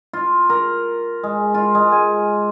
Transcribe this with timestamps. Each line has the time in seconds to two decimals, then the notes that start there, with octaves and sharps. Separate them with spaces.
0.13 F4
0.50 A#4
1.23 G#3
1.54 F4
1.75 G#3
1.92 G#5